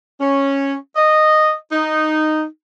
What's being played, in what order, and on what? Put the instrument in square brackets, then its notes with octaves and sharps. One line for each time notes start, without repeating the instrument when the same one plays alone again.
[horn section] C#4
D#5
D#4